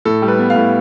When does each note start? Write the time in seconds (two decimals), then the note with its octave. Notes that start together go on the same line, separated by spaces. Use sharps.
0.05 A2 A4
0.22 G3
0.28 B4
0.39 B3
0.50 F5
0.56 A2